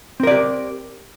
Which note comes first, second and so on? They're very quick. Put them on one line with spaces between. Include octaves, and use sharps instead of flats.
C4 A#4 D5 G4